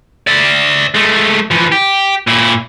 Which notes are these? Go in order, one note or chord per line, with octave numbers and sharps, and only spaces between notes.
D5 E5
G#3 A3
E3 F3
G4
A#2 E4